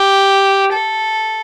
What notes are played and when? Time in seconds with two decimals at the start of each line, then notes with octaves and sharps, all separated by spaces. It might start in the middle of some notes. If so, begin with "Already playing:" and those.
Already playing: G4
0.73 A4